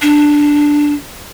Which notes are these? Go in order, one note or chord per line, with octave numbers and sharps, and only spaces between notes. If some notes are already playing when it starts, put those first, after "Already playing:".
D4